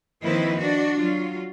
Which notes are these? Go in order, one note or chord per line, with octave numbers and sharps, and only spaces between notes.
D#3 F3 A#3 C4 E4 B4
D4 F#4
F#3 F4